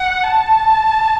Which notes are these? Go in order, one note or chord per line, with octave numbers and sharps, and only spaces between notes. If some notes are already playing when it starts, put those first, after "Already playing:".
Already playing: F#5
A5